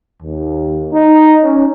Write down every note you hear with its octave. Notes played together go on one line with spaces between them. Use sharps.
D#2
D#4
C#4